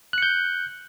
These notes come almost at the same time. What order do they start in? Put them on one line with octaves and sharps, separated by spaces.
F#6 C#7 G6